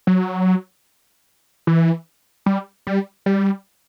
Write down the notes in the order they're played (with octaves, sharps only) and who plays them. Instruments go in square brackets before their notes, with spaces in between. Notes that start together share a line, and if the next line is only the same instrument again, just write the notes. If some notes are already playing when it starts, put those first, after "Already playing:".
[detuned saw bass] F#3
E3
G3
G3
G3